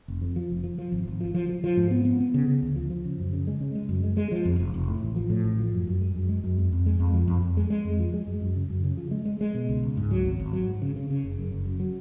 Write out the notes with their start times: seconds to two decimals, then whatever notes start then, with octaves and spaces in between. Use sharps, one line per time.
0.08 F1
0.22 F2
0.36 F3
0.50 F1
0.64 F3
0.78 F3
0.92 G#1
1.07 G#1
1.21 F3
1.34 F3
1.49 F3
1.64 F3
1.77 G#2
1.91 B3
2.05 B3
2.20 B3
2.34 C#3
2.48 C#3
2.62 D2
2.76 F3
2.90 F3
3.05 C#3
3.18 F#2
3.33 C#3
3.47 G#3
3.61 C#3
3.75 G#3
3.89 F#2
4.04 G#3
4.17 G#3
4.32 F3
4.45 F2
4.60 F1
4.74 F1
4.88 A2
5.03 A1
5.16 F3
5.30 A2
5.44 A1
5.59 F3
5.72 F#2
5.87 F#2
6.01 G#3
6.16 F#2
6.29 G#3
6.44 F#2
6.58 F2
6.72 F2
6.86 G#3
7.00 F2
7.14 F3
7.28 F2
7.42 F2
7.57 G#3
7.70 G#3
7.85 F2
7.99 F3
8.14 G#3
8.27 F#2
8.41 F#2
8.56 C#3
8.70 F#2
8.84 C#3
8.97 F3
9.11 G#3
9.25 G#3
9.41 G#3
9.54 B2
9.69 C#2
9.83 C#2
9.97 G#2
10.11 F#3
10.25 G#1
10.40 G#1
10.53 F#3
10.68 G#2
10.82 C#3
10.96 C#3
11.10 C#3
11.24 F#1
11.38 F#2
11.52 F#1
11.66 F#2
11.80 F#3